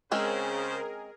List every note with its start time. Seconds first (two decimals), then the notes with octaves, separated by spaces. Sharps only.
0.12 C#3 G#3 C4 C#4 G#4 A#4 C5